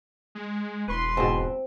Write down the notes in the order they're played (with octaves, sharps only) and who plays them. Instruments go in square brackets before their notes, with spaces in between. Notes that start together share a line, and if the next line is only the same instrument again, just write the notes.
[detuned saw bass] G#3
[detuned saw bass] E1 [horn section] B4 C6
[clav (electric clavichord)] G#2 B2 [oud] C4